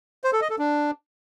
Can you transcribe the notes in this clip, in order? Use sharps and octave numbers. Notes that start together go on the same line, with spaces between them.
C5
A4
D#5
A4
D4